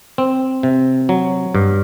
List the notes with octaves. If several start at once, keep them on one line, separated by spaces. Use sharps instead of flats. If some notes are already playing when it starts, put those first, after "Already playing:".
C4
C3
F#3
G2